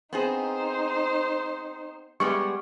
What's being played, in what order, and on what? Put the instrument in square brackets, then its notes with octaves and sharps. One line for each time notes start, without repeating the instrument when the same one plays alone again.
[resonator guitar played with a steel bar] B3 C4 G#4 [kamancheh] D#4 C5
[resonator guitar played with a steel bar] G3 G#3 B3 [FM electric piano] C#6